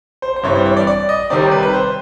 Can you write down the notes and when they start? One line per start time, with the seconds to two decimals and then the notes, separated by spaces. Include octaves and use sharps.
0.22 C5
0.36 C5
0.43 G2 E3 G3 C4 C#5
0.55 C5
0.65 C#5
0.77 D5
0.87 D5
1.09 D#5
1.30 C3 D#3 G3 C4 D5
1.40 C#5
1.51 B4
1.63 B4
1.73 C5